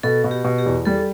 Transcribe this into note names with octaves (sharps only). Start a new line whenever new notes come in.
B2 A4
B2
G4
B2
G4
E2
G3 A4